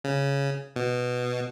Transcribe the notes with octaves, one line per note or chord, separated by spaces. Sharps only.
C#3
B2